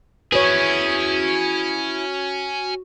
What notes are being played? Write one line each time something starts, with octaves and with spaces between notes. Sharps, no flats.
C#4 E4 F#4 G#4 B4 C#5